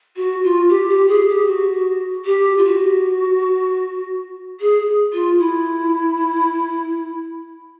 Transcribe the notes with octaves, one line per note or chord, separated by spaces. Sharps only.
F#4
F4
G4
G4
G#4
G4
F#4
G4
F4
F#4
G#4
F4
E4